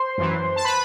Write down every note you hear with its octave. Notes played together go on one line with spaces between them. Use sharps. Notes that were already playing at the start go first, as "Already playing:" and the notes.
Already playing: C5 C6
F#2 E3
A5
B4 B5